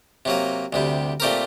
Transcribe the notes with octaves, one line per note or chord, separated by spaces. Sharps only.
C3 F#3 A#3
D2 C3 G3
A#2 A3 C4 G4 A#4